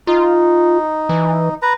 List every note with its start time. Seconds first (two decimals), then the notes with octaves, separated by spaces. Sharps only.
0.07 D#4 F4
1.09 E3
1.62 B4 A#5